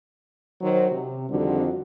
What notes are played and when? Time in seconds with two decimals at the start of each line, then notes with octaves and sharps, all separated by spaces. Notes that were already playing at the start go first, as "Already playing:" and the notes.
0.61 D#3 F#3 F#4 C5
0.92 C3
1.29 F2 D3 D#3 G3 C4 F#4